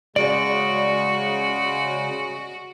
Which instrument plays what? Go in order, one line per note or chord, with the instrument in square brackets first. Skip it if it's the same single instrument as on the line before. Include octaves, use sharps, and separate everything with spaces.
[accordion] C#3 G#3 [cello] F#4 [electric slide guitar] D5 [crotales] D7